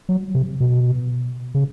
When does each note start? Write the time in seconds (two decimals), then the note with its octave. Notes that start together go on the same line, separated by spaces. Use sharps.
0.09 F#3
0.35 C3
0.60 B2
1.54 C#3